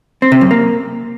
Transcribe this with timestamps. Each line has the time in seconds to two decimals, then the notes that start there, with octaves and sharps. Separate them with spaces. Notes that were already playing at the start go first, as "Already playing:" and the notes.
0.22 C4
0.32 C3
0.41 F#2
0.51 A#3